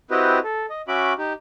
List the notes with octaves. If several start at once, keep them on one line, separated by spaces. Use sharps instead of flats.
C4 E4 F#4 G4 B4 D#5
A4
D#5
C#4 F#4 E5 B5 D6
D#4 G4